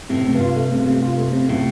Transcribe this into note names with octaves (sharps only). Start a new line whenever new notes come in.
A2 C3
C3
G2
F4
A3
C3
C3
F4
A3
C3
A2 C3